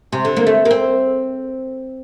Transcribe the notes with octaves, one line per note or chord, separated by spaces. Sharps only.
C3
D3
A#3
A3
A#3
C4